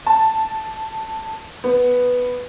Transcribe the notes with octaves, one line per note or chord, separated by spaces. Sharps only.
A5
B3